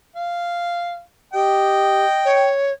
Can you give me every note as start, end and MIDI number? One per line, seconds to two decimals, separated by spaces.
0.16 1.00 77
1.33 2.05 67
1.33 2.46 75
1.33 2.46 79
2.25 2.73 73